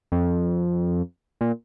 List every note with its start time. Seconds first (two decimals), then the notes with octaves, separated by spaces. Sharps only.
0.12 F2
1.41 A#2